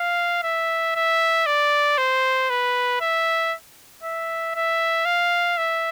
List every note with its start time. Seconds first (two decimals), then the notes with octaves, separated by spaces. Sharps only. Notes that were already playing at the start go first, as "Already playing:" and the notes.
Already playing: F5
0.43 E5
0.95 E5
1.46 D5
1.98 C5
2.50 B4
3.01 E5
4.03 E5
4.55 E5
5.05 F5
5.57 E5